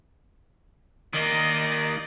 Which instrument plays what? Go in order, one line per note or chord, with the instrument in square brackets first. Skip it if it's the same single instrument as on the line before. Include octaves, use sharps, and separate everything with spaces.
[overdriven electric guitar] D#3 A#3 [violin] D5 D#5